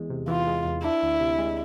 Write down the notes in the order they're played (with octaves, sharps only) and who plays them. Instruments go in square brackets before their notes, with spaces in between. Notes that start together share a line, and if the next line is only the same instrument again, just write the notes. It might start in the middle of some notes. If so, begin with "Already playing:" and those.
Already playing: [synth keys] E2 G#3
C3
[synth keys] E3 [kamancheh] F4
[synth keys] G#3
E2
[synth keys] D4 [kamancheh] E4
[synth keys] D2
C3
G#3